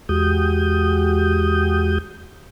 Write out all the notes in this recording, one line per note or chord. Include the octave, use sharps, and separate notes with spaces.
E2 G#3 F#4 G4 D#6 G6